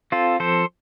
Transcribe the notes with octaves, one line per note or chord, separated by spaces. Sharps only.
C4 F4 A4
F3 A4 C5